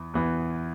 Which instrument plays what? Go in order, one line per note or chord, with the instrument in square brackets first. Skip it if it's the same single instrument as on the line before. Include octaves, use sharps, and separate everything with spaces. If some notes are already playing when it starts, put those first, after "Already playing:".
Already playing: [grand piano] E2 E3
E2 E3 B3